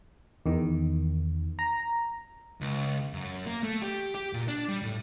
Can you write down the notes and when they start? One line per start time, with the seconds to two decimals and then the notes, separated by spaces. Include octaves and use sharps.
0.46 E2 D#3
1.59 A#5
2.61 C#2
3.13 F#2
3.46 A#3
3.63 A3
3.82 G4
4.15 G4
4.33 A#2
4.48 D4
4.69 G3
4.83 A2